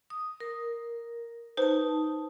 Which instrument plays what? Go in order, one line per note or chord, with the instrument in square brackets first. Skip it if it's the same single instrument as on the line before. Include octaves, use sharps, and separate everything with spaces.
[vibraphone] D#6
A#4
[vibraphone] D#4 A5 [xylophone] B4 C5